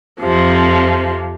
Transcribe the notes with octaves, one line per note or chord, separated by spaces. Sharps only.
F2 C3 F3